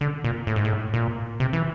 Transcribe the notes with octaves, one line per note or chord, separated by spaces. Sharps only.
D3
A#2
A2
G#2
A2
A#2
C3
E3